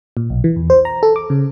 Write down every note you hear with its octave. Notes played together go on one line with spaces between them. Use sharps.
A#2
B1
E3
E2
C5
A#5
A4
D6
C#3